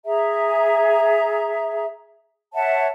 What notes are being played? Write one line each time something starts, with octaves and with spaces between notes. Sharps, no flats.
G#4 E5 A#5
C#5 E5 F#5 A5